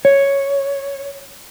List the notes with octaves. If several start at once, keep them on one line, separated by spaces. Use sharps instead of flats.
C#5